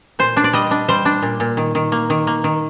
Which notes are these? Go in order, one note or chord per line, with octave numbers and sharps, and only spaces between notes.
A#2 C5
D4
D5
G3 D#5
D4
G3 C5
D4
A#2
A#2
D#3
D#3
A#3
D#3
A#3
D#3